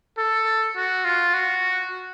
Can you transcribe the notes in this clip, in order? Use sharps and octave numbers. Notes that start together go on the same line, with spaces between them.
A4
F#4
F4
F#4